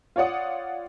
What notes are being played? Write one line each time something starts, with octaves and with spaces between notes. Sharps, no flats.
F4 C#5 D5 F#5 D#6